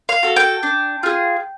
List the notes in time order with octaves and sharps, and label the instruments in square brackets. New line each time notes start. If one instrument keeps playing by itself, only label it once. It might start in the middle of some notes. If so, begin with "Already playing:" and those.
[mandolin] F5
F#4 A4
G5
D4
F4 G#4